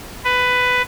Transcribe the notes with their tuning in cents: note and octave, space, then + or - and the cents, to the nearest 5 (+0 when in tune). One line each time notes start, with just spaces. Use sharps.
B4 +10